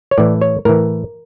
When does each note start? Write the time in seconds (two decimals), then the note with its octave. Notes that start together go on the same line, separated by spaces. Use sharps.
0.11 C#5
0.18 A2 E3 D5
0.42 C#5
0.65 A2 E3 A#4